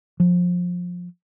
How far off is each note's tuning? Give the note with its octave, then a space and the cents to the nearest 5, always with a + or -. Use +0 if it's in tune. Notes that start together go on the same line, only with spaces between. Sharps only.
F3 +25